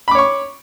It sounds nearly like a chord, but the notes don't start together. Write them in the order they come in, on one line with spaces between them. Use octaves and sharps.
B5 D6 C#5 C#6